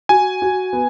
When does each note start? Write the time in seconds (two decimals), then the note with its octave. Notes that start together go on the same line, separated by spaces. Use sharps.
0.09 F#4 G#5
0.42 F#4
0.73 B3